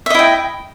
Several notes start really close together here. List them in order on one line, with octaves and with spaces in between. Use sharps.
E5 D#5 E4 G5